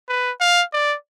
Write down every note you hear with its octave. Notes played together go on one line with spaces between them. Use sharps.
B4
F5
D5